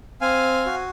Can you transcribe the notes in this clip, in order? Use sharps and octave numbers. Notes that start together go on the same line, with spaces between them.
C4 F5 G#5
F#4